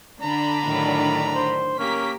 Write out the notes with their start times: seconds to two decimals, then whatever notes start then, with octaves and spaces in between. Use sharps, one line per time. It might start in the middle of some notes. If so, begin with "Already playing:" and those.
0.22 D3 D4 A#5 B5
0.64 A2 D#3 F#3
1.34 C5
1.79 A#3 C#4 G4 A#4 B6